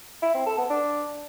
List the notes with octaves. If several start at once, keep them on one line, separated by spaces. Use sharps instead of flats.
E4
C4
A4
B3
D4